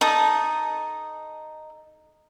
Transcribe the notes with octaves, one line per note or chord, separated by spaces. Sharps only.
D#4 A4 D#5 D#6